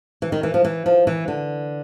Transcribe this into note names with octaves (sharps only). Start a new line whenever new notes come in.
E3
D#3
E3
F3
E3
F3
E3
D3